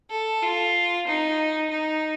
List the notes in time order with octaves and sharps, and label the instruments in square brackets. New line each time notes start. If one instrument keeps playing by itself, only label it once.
[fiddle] A4
F4
D#4
D#4